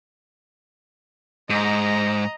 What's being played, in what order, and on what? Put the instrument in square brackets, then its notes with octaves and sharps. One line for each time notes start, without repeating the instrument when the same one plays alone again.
[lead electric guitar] G#2 [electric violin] D#5 A#5